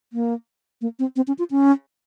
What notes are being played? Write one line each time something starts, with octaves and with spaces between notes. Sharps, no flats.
A#3
A#3
C4
C4
C#4
F4
C#4